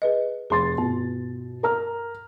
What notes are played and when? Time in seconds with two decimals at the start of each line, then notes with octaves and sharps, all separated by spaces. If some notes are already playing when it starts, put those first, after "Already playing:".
0.02 G#4 B4 D#5
0.50 F1 G#4 C6 A6
0.78 G2 B2
1.63 A#4 A#5 F6